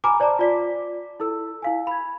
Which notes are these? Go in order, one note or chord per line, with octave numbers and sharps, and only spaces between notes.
G#5 A#5 B5 D6 F6
C5 D5 A5 A#5 D6
F4 D5 B6
E4 A4 E6
E4 F5 G#5
B5 G#6